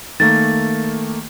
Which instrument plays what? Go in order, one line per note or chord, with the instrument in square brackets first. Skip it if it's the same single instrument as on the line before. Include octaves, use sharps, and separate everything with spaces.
[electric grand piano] D#3 A3 A#3 [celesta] A6